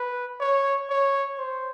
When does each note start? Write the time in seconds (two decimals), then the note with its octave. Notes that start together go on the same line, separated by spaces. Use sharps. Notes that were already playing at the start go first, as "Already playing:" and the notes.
Already playing: B4
0.40 C#5
0.90 C#5
1.38 C5